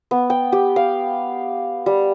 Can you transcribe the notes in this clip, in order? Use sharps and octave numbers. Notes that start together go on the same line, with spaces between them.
B3
G5
G4
F5
G3